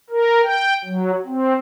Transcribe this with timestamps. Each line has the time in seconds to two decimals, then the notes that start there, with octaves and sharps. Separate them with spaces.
0.10 A#4
0.43 G5
0.85 F#3
1.26 C4